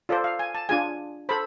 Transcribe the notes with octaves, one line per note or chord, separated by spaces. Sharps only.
F4 A4 C5 D5
F5
G#5
A5
D4 F4 G#4 G#5
A4 C5 B5